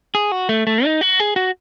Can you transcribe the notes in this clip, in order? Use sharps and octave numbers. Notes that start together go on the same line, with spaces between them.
G#4
F#4
A3
A3
D#4
F#4
G#4
F#4